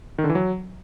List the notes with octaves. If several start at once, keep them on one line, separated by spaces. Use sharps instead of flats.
D#3
D3
E3
F#3